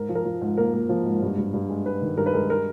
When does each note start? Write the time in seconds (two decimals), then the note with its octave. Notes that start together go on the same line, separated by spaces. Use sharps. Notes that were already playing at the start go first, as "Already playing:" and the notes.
Already playing: G#2 A#4
0.09 F3
0.15 A#4
0.25 F3
0.41 G#2
0.57 A#3 A#4
0.73 A#3
0.89 F3
1.06 G#2
1.22 G2
1.38 G2
1.53 G2
1.69 G#3
1.86 G#3 B4
2.02 D#3
2.17 G2 A#4
2.26 B4
2.33 G#3 A#4
2.50 A#4